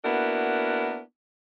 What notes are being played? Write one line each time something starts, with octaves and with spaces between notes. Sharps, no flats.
A#3 B3 D4 E4 F#4 A#4